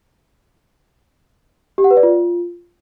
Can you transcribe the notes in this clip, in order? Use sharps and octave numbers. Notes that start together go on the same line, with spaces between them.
G4
F#5
B4
D5
F4